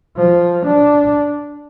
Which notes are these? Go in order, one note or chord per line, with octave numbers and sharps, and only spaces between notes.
F3
D4